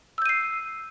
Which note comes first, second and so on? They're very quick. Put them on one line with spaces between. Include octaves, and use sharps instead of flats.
E6 G6 D#7 C7